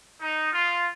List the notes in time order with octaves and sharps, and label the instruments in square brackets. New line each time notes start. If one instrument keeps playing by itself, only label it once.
[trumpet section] D#4
F4